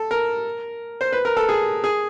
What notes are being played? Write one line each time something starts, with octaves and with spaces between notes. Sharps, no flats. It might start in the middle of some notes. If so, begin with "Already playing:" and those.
Already playing: A4
A#4
C5
B4
A#4
A4
G#4
G#4